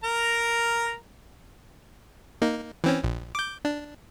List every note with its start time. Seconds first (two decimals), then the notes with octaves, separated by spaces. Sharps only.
0.04 A#4 A#5
2.42 A#3 D#4
2.84 E3 C4 C#4
3.04 A#1
3.35 D6 G6
3.65 D4